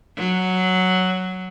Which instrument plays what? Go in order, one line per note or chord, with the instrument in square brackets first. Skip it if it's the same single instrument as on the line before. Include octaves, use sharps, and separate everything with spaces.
[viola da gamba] F#3